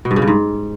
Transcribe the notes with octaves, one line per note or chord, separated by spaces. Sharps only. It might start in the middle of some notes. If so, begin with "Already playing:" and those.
B2
G2
C#3
G2
G#2